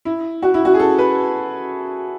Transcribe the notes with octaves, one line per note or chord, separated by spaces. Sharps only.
E4
F#4
E4
F#4
G#4
A4
B4